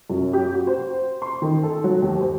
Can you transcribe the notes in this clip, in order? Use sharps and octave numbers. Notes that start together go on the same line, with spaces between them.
F#2
G4
F#4
C5
C6
D#3
A4
F#3
D#2
C5